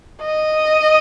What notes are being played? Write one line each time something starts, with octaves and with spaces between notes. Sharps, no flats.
D#5